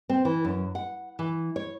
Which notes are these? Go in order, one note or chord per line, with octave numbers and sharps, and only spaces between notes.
C4
E3
F#2
F#5
E3
C#5